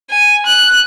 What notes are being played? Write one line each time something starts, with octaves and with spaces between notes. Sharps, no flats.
G#5
F#6